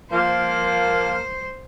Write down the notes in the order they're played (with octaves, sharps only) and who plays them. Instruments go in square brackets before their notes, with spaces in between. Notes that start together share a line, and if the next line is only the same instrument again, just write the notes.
[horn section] F3 A#3 [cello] C5